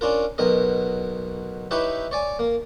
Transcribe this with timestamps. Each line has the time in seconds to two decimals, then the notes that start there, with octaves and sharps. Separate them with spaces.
0.01 C#4 D4 F4 A#4
0.38 B1 B2 A#4 D#5
1.71 D#4 E4 G4 B4 C#5 E5
2.11 C#5 D5 G#5
2.39 A#3